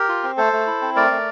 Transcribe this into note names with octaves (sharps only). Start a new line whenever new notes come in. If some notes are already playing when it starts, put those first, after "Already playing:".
Already playing: G4 A#4
F4
C4
A3 A4 C5
A3
E4
C4
A3 A#4 D5
A3